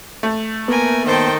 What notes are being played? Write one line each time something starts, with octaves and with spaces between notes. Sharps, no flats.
A3
A#3 B3 A#4 B4 G#5
D#3 A4 C5 G5